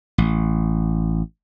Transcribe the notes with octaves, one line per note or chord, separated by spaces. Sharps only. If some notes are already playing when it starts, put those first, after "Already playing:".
A1